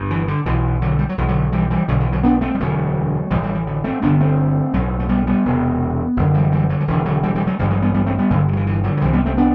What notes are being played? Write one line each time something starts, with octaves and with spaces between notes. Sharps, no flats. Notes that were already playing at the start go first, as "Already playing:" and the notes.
Already playing: G1 G2
E3
D3
B1 B2 E3
D3 F#3
G3
F#3
B1 B2 E3
D3 F#3
E3 G3
E3 G3
B1 B2 D3 F#3
E3
D3 F#3
B3 D4
A3 C4
G3
E1 D2 D3 F#3 A3
A1 A2 E3 G3
E3 G3
E3
D3
A3 C4
G1 G2 D3 B3 D4
A3 C4
B1 A2 F#3 A3
A3
G3 B3
G3 B3
E1 E2 C3
F#1 F#2 D3
E3 G3
E3 G3
D3 F#3
F#3
E1 D2 D3 E3
D3 F#3
E3 G3
E3 G3
F#3 A3
A1 G2 D3 G3
F#3 A3
G3 B3
G3 B3
A3 C4
G3 B3
G1 G2 D3 F#3 A3
D3
F#3
E3
E3
D3 F#3
F#3
C2 C3 E3 G3
G3 B3
A3 C4
B3 D4